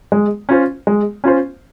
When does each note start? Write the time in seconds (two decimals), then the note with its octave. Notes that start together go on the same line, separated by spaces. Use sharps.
0.12 G#3
0.49 C#4 F4 C5
0.87 G#3
1.24 C#4 F4 C5